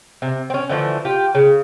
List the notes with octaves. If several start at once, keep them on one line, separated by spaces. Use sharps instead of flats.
C3
C4 C#4
D3 E3 F3 A3
F4 G4
C#3